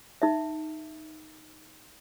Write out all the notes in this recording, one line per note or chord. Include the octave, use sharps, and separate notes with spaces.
D#4 E5